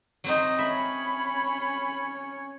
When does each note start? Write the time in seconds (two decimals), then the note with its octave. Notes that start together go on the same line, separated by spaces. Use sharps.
0.24 F#3 C4 D#4
0.59 C#4 C#5 E5 B5